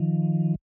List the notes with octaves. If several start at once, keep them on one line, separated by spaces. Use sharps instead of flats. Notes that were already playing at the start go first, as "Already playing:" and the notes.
Already playing: D#3 F3